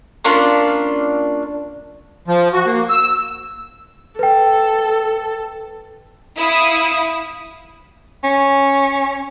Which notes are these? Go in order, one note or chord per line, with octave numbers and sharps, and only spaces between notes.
A#3 C#4 D4 F4
F3
F#4
A#3
E6
A4 B4 G5
E4 F5 D#6
C#4